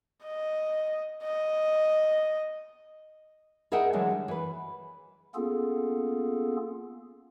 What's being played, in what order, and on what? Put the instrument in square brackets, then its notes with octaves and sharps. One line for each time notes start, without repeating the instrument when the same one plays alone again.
[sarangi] D#5
D#5
[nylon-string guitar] G#4 A#4 D#5 E5 F#5 G5
D3 E3 F#3 G#3 A3
G3
E3 B4
[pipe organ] A#3 B3 C#4 F4 G#4 A4